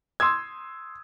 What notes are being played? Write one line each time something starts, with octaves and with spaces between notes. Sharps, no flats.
C6 D#6 E6 G#6